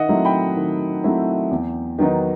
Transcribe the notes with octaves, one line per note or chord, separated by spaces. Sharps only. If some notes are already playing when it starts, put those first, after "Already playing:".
Already playing: D#3 D#5 E5 F#5
F#3 A3 C4 E4
G5 B5
D#3
F#3 A3 C4 E4
E2
D#3 F#3 B3 D#4